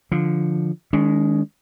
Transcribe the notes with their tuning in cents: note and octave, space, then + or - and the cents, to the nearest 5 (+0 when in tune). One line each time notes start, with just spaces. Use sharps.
D3 +5 F3 +0
D#3 +0 G#3 +0 C#4 +45